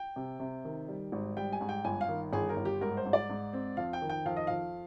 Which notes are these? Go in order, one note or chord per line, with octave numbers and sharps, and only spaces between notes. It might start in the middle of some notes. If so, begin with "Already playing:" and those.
Already playing: G5
C3
C3
D#3
G3
G#1
G3 G5
G#5
G#2
G5
G1 G#5
F5
D#3
G1 G#4
A#4
G1
G4
G#2 A#4
C5
G#2
D5
G#2
C4
F2 F5
G5
D#3
G5
F2 F5
D#5
F2 F5